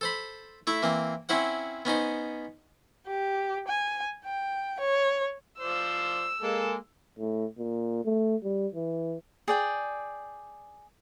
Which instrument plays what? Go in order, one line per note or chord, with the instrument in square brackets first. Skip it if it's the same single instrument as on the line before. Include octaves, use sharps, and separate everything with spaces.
[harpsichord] A4 C5 B5
A3 E4 E5
E3 A#3 C4
C4 C#4 E4 C5 F#5
B3 C#4 D#4 C5
[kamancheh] G4
G#5
G5
C#5
[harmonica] F3 C5 D5 [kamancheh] E6
[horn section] G#3 A#3 [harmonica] A4
[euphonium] A2
A#2
A3
G3
E3
[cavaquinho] G#4 D5 G5